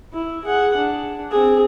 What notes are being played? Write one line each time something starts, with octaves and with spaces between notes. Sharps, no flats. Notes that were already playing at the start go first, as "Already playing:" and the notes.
E4
G#4 F#5
D4
C4 G#4